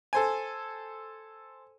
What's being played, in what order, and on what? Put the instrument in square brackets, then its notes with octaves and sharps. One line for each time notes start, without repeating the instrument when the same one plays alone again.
[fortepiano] A4 C5 G#5